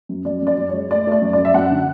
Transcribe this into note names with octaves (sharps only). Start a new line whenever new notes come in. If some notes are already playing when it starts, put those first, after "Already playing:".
F#2
F#2 D5
F#2 D5
F#2
G#3 C#5
A3 D5
A3 D5
F#2
F#2 D5
E5
F#2 F#5
D3